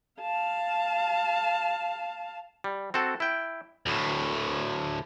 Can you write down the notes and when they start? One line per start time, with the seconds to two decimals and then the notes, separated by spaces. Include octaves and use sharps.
0.22 F5 A5
2.64 G3
2.94 C4 F#4 A4
3.20 E4 G5
3.86 D2 A2